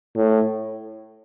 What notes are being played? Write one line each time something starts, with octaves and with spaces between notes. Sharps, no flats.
A2